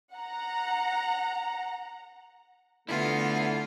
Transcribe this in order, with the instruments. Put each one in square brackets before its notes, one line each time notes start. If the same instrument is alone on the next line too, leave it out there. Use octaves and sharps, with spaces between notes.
[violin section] F#5 A#5
[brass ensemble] D3 A3 [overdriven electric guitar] B3 E4 [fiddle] F4